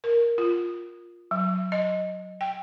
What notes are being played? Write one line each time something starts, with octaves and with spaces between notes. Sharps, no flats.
A#4
F4
F#3
D#5
G5